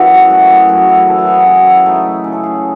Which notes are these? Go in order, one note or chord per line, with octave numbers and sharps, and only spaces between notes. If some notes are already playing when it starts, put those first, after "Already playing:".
Already playing: F#2 E3 E4 F#4 G#4
A3 F#4
G#4
F#2 F#4
E4
E3 A4
F#4
G#4
C#3 F#4
E4
A3 D#4
E4
C#3
A4
G#4